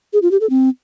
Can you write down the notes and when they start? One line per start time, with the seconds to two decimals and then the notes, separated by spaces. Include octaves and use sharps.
0.13 G#4
0.22 F4
0.31 G4
0.41 A4
0.50 C4